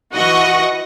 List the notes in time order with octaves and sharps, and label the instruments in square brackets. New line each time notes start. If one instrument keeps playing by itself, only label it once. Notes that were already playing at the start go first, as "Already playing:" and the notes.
[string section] E3 F#4 D#5 F#5 C#6